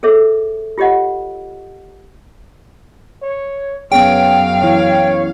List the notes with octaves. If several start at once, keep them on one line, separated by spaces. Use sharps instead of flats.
G#4 A4 C#5 E5
F4 G4 C#5 D#5 F#5
C#5
F#2 B3 C#4 G#4 C#5 F5 G5
E3 E4 C#5